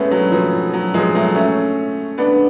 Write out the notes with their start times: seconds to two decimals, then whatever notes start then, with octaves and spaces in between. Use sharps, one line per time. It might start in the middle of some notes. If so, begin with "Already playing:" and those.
Already playing: G#3 A3 B3 C#4
0.11 F#3
0.32 F3
0.73 F#3
0.94 F3 G#3
1.15 F#3 A3
1.35 A3 C#4
2.18 B3 D4